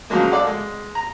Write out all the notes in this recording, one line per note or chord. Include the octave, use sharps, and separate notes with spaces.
C#3 F3 F#3 G#3 A#3
A4 D5 F5 F#5
G#3
A#5